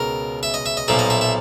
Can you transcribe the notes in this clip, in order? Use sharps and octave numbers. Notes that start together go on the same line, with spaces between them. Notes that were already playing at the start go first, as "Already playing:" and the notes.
Already playing: C#2 B2 A#4
E5
D#5
E5
D#5
B1 A#2 F3 E5
D#5
E5
E5